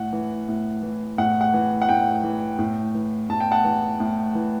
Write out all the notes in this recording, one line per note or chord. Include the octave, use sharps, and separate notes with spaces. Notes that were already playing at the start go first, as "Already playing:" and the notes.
Already playing: A2 F#5
E3
A2
E3
A2 F#5
F#5
E3
F#5
A2 G5
E3
A2
E3
A2 A5
G5
F#5 A5
E3
A2
E3